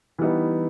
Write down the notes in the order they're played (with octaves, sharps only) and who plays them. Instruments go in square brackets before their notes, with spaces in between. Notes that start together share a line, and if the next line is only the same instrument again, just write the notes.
[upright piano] E3 G3 B3 D#4